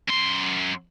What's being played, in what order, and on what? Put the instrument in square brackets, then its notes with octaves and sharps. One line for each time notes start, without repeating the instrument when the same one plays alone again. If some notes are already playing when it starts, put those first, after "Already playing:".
[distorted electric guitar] F#2 C6